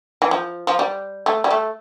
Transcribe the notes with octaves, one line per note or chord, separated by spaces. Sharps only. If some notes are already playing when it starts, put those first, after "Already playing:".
E3
F3
F3
G3
A3
G3
A3